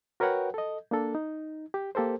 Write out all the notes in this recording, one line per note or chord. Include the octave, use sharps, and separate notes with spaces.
F#4 A#4 B4 C#5 F#5 G5
A4 D#5
A#3 D4 A4
D#4
G4
A#3 G4 A4 A#4 C5